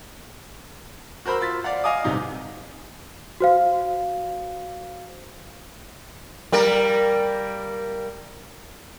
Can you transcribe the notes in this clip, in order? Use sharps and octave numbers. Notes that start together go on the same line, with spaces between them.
F#4 A#4 C5 B5 E6
F4 C6 A6 B6
D5 F5 F#5
D#5 F5 G#5 D6 D#6
G1 G#2 C3 D#4 D#5
F#4 C5 F5
G3 A#3 A#4